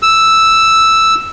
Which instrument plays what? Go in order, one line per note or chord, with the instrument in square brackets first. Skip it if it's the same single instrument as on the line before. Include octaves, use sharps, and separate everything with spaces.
[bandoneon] E6